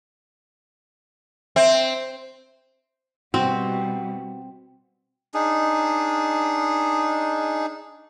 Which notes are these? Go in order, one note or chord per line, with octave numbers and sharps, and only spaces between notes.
C4 E5
B2 G3 C4 F#4
D4 D#4 G#4